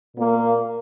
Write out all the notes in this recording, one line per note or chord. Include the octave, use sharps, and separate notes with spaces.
A#2 A#3